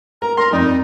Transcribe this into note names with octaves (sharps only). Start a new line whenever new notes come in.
A#4 A#5
A#4 C6
F2 D#4 D5